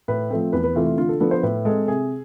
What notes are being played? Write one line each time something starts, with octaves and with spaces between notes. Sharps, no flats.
A2 B4
F3 A3 C4
E2 B4
B4
C3 E3 A3 F4
F4
D3 F4
A4
F3 B3 D4 A4
C5
A2 B4
G#3 C4 A4
C3 G#4